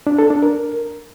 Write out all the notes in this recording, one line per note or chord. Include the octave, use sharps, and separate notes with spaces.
D4
A4
D4
A#4